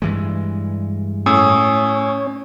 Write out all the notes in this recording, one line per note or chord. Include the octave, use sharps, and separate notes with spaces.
G2 E3 G#3
A2 C#4 G#5 D#6 E6